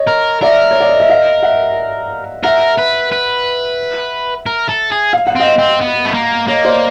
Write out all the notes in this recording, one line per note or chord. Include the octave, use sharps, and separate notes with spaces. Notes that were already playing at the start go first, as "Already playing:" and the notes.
Already playing: C#5 D#5
A#4
A#4 D5 E5
C#5
D5
D#5
E5
D#5 F5
E5 F#5
A#4 E5 F#5
B4
B4
A#4
A4
G#4
F5
F#5
C4 D#5 F5
C4
B3
A3
A#3
A#3 C#5 D#5
C5 D5